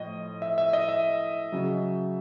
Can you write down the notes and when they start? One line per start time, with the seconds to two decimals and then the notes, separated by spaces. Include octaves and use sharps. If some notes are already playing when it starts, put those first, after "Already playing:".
Already playing: A2 F3 D#5
0.42 E5
0.58 E5
0.73 D#5
0.89 E5
1.52 C#3 F#3